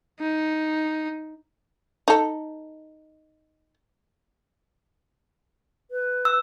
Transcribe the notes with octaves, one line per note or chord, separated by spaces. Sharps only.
D#4
D#4 A4
B4
E6